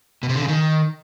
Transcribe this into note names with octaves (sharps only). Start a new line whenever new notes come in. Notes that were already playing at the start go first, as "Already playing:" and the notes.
B2
C3
D3
C#3
D#3